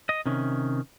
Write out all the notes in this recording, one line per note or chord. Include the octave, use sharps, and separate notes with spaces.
D#5
C3 D#3 C#4